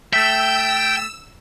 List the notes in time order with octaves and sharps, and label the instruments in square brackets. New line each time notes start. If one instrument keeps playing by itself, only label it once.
[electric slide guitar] A3 E5 [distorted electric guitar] G5 [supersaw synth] E6 E7